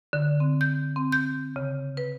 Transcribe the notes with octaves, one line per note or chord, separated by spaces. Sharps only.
D3
C4
G6
C4
G6
C#3
B4